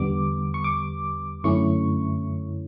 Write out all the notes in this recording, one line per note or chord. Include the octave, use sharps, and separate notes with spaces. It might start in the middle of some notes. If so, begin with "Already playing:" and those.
Already playing: E2 D3 G3 B3 D6
C#6
D6
F#2 D3 A3 C#4 E4 C#6